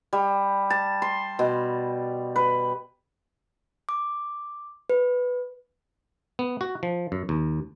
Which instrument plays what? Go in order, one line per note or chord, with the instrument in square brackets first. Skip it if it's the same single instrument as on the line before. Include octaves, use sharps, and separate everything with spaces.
[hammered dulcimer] G3
A5
C6
B2
B4
[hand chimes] D6
B4
[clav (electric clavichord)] B3
F#4
F3
F#2
D#2